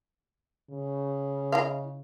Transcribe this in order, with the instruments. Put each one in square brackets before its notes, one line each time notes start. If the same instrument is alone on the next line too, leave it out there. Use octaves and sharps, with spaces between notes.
[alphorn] C#3
[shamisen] E4 D#5 F5